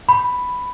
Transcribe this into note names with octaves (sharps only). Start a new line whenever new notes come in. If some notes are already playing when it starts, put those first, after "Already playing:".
B5